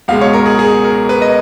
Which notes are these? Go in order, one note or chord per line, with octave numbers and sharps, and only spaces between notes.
C#2 B2 G#3 F5
C#5
A#4
G#4
G#4
A#4
B4
D#5